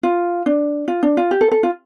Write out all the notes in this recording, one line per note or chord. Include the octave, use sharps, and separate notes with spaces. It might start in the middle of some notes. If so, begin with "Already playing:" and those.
F4
D4
F4
D4
F4
G4
A4
A4
F4